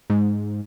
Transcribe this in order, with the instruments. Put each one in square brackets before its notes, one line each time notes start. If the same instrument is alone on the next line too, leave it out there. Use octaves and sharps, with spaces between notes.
[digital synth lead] G#2